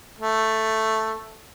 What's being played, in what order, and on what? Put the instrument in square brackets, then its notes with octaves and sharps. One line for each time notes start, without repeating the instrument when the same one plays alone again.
[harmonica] A3